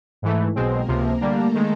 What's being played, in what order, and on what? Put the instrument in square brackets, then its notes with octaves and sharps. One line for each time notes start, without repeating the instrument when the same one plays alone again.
[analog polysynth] G#2 E3 A3
[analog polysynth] B1 B2 G#3 C4 [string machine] A#3 A#4
[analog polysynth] C#2 C3 F3
[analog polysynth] D3 G3 A#3 D4 [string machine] A3 A4
[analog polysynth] D#3 G#3